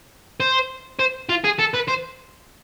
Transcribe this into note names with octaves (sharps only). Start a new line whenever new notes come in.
C5
C5
F4
G#4
A4
B4
C5